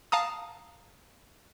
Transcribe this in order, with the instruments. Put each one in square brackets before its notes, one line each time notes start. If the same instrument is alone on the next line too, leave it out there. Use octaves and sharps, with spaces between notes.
[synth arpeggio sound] F5 A5 A#5 D#6